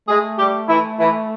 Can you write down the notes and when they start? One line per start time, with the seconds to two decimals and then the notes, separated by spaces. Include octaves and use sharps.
0.08 G#3 A3 G#4
0.39 G3 G4
0.68 E3 E4
0.99 E3 E4